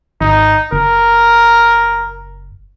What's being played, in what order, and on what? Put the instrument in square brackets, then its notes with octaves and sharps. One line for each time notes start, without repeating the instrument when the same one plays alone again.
[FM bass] G#1 [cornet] D#4
[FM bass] F#1 [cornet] A#4